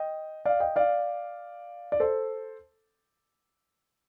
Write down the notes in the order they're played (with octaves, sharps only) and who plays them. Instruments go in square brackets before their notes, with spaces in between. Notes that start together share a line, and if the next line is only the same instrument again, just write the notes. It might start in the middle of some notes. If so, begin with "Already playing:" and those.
Already playing: [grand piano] D#5 G5
D5 F5
D#5 G5
D5 F5
D5
A4 C5